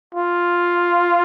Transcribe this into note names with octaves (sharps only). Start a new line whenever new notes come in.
F4